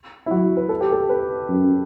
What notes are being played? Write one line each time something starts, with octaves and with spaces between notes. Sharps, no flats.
E4
F#3 F#4
B4
A4
G4
A4
B4
F#2